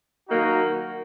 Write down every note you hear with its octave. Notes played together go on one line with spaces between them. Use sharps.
D#3 F#3 A#3 D#4 F#4